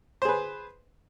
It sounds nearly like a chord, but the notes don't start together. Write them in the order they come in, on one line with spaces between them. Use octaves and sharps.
C5 G#4 B4